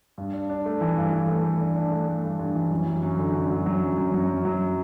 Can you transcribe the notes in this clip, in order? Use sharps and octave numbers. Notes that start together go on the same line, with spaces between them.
G2
D4
D4
A3
E3
G2
E3
A3
A3
D4
D4
A3
A3
G2
G2
E3
F#2
F#3
F#2
D3
D3
F#3
F#3
F#2
F#2
F#2
F#2
F#3